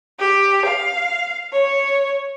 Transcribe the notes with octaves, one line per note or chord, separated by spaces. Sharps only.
G4
F5
C#5